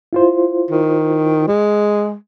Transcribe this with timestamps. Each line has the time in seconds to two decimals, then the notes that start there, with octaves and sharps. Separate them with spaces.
0.13 E4 F4 C5
0.70 D#3
1.48 G#3